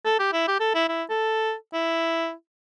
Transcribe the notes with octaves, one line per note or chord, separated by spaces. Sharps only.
A4
G4
E4
G4
A4
E4
E4
A4
E4